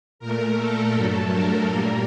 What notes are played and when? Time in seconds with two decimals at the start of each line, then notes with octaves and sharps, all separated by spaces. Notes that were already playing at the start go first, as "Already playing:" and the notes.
0.19 A#2 A3 A#4
0.57 A4
0.93 G2 F#3 A3
1.30 A#4
1.66 A#2 G3 A#3 A#4